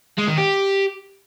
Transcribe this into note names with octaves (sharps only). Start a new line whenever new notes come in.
G#3
D#3
G4